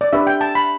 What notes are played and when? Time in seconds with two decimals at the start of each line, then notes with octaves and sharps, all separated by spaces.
0.01 D5
0.13 D4 G4 B4 E5
0.27 G5
0.41 A5
0.55 B5